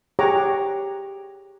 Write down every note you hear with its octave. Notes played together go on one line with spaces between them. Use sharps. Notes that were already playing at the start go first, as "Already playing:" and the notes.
G4 G#4 C#5 F#5 A#5 D6